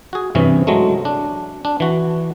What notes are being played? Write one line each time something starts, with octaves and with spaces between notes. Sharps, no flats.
F#4 G#4
G2 C3 E3 C#4
F#3 G#3 A3
D4
D4
E3 F#4